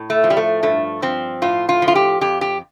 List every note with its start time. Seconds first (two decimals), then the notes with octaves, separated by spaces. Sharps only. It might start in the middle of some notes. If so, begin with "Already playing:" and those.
Already playing: A2
0.10 A3
0.24 F3
0.30 G3
0.37 A3
0.63 G2 A3
1.02 F3 C4
1.42 A2 F4
1.69 F4
1.82 F3
1.88 F4
1.95 G4
2.21 F2 G4
2.41 G4